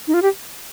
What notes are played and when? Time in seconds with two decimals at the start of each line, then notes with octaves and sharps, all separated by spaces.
0.07 D#4
0.14 F4
0.22 G4